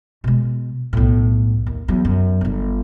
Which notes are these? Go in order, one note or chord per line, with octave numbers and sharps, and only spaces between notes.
B2 G#3
B1 A2
D#2
E2 F#3
F#2
G1 D3